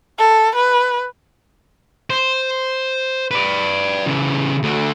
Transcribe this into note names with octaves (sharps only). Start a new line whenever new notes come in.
A4
B4
C5
B4 D5
C#3 E3
D2 D3